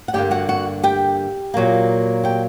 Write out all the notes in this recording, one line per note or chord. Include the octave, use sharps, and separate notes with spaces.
F#5
G2 D3 G3 A#3 G4 G5
F#4 F#5
F#4 F#5
G4 G5
A#2 F#3 A#3
G4 G5